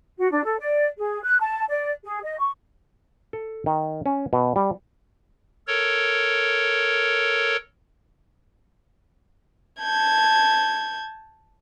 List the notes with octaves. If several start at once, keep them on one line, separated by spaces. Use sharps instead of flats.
F#4
D4
A4
D5
G#4
F#6
A5
D5
G#4
D#5
C#6
A4
D#3
C#4
B2
G3
A4 A#4 C#5
A5 G6 G#6